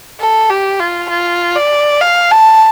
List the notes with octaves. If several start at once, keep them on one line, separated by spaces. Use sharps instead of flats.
A4
G4
F4
F4
D5
F5
A5